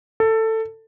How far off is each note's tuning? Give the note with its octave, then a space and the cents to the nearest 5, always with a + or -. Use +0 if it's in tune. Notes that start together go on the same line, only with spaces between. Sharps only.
A4 +15